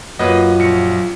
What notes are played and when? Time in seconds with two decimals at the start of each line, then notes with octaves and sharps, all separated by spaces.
0.19 F#2 A#3 F4 B4 D#5
0.59 A#1 C#7